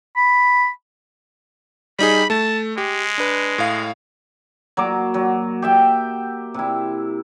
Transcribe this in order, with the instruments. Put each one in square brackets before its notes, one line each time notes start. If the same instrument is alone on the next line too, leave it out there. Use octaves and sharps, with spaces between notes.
[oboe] B5
[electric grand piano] G3 D#4 G#4 [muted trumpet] B5
[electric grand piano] A3 [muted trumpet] A5
[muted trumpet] G#3 [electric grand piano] G4
[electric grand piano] D4 B4
A2 F5
[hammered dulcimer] F#3 A#3 D6
F#3
G4 E5 G5
C3 E4